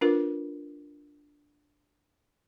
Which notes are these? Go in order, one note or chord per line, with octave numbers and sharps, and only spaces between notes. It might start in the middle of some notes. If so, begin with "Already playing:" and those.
D4 F4 A#4 B4